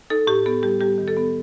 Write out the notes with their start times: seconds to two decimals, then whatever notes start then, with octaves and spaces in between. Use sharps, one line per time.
0.10 D#4 A4
0.27 A2 G4
0.46 B3 A4
0.63 G3 G4
0.80 G3 G4
0.98 D#3
1.08 A4
1.17 B3